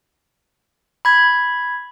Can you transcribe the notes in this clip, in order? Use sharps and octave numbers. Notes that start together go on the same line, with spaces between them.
B5 G#6